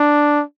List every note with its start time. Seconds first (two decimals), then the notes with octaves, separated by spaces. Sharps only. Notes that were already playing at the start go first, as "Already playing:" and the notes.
Already playing: D4